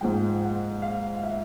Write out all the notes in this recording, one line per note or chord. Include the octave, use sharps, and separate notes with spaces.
G#2 F3 G#3 G5
F#5
F5
E5